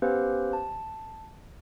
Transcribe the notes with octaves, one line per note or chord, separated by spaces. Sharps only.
B3 C#4 G4 B4 C5 F5
A5